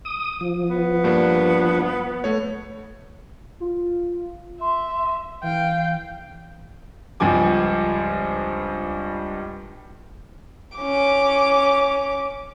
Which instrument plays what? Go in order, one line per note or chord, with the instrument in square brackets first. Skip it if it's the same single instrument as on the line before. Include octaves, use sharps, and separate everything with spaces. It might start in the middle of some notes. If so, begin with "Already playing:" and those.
[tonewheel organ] D#6
F3
[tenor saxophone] B3
[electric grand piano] G2 A#3 D4
A3 C#5
[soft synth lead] F4
[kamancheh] E5 [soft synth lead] C6
[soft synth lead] E3 [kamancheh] F5 G5
[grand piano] C#2 G2 F3 C4 G#5 D6
[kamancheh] C#4 D6